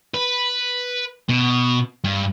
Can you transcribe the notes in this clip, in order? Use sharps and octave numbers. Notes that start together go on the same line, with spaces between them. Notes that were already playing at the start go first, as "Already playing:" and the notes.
B4
B2
G2